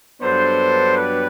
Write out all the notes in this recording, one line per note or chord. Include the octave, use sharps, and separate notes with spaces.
G2 F#3 B3 D4 A4 C5
G4 B4